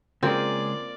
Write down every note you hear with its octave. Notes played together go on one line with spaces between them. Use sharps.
C#3 G#3 A#3 C4 F4 G#4 D5